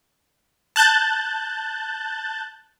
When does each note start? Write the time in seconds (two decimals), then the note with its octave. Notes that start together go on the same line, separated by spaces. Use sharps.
0.76 A5 F#6 G6 A6